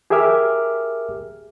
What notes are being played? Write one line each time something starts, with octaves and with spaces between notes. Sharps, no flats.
G4 G#4 A#4 E5 D6 F6